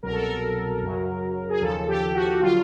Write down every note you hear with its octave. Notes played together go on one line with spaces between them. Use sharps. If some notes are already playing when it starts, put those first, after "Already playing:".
C2 B2 F#3 A#4
A4
A#4
F#2 C#3 F#3
G#4
D#2 C#3 F3 A4
G4
F#4
D3 F#3 F4